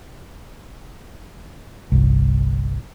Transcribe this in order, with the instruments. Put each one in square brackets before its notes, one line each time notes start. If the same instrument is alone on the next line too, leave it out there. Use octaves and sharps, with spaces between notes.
[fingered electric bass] G1 C2